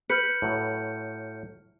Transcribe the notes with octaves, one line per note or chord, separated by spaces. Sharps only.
B4 F6 G6 C#7
A2 F#3